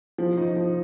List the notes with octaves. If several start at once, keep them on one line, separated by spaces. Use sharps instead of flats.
F3
D#4
F3